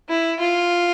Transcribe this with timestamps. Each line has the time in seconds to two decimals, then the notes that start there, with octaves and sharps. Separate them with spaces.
0.09 E4
0.40 F4